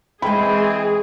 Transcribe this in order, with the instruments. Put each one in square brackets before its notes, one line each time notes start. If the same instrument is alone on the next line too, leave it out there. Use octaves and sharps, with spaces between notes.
[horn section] E3 C4 [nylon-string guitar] G#3 G5 [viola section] G#4 [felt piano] B5